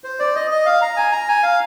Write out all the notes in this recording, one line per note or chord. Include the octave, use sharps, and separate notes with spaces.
C5
D5
D#5
D#5
F5
A#5
G#5
A#5
G#5
F5